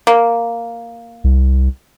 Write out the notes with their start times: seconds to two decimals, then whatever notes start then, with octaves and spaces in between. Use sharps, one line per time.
0.07 A#3
1.24 C2